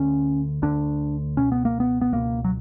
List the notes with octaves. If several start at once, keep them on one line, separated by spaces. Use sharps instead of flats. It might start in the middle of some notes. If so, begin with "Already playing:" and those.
Already playing: D2 D3 C#4
D2 D3 D4
C#2 B2 C#4
B3
A#3
B3
B3
C#2 B2 A#3
F#3